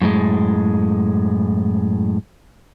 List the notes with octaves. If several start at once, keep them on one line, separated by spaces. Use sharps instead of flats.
F#2 A2 G#3